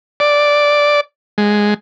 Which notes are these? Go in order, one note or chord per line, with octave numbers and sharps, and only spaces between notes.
D5
G#3